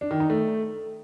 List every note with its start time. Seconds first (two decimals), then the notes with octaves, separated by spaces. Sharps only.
0.01 D4
0.11 D#3
0.20 D#4
0.30 A3